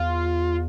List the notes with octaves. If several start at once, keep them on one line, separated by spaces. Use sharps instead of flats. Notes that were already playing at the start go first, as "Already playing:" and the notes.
Already playing: E2 F4